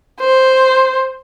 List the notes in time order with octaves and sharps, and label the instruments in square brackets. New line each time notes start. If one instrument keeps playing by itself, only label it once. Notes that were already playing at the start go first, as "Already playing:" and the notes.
[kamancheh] C5